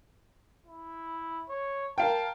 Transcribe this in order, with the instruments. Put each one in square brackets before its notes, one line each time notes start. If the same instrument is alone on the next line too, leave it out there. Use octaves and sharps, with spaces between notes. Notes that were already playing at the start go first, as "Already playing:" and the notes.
[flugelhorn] E4
C#5
[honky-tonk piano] A#4 F5 G5 [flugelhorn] A5